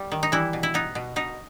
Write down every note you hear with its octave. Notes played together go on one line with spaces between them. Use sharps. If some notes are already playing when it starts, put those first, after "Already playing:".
Already playing: G3
D#3
D#4
E3 G3 E4
B2
E4
B3 D#4
B2
B2 D#4